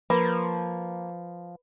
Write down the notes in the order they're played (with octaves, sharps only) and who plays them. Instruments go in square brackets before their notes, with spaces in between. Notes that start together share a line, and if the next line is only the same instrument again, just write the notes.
[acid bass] F3 [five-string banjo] A#3 [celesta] B4 B5